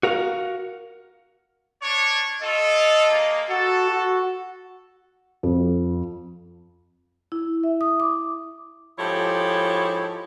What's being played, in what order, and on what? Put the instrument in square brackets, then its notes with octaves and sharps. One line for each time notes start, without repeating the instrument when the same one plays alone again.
[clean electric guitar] F#4 A#4 F5 F#5
[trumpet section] D4 C#5
[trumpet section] F4 A4 [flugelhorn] D#5
[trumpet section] G#3 A#3
[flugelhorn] F#4 [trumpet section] A4
[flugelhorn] F#4
[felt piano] F2
[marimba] E4
E5
D#6
D6
[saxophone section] G#2 F3 E4 G4 A4 C#5